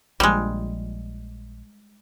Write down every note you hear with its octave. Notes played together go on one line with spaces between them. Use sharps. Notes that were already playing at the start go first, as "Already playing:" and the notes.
A#1 F3 G3 G#3